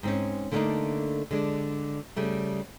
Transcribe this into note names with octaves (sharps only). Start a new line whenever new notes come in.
G#2 C4 C#4
D3 A3 A#3 C4 D4 D#4
D3 G#3 D4
C#3 G3 A3